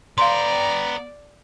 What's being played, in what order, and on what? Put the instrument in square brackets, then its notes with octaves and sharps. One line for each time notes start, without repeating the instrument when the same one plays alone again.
[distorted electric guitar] B3 G5 [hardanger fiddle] D5 [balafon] F5 C6 [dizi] A#5